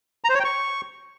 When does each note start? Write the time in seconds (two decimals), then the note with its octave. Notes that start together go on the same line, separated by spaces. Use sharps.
0.24 A#5
0.29 C5
0.35 C#5
0.40 G5
0.45 C#6